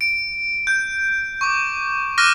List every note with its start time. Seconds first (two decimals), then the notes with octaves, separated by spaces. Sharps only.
0.01 D7
0.67 G6
1.41 C#6 D6
2.18 D6 F6 F#6 A#6 D#7